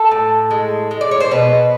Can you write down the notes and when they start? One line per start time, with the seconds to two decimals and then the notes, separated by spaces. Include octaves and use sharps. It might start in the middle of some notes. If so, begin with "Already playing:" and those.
Already playing: A4
0.11 A2
0.51 G#3
0.91 G#3
1.01 D5
1.11 C#5
1.20 C5
1.31 B2 B4